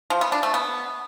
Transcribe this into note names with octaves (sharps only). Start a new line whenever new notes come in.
F3
B3
D4
A3
B3